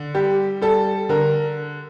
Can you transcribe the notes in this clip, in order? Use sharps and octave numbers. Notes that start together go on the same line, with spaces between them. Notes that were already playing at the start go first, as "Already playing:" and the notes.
Already playing: D3
G3 G4
G3 A4
D3 A#4